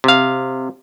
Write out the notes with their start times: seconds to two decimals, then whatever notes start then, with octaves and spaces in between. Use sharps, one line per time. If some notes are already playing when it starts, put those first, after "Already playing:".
0.04 C3 F5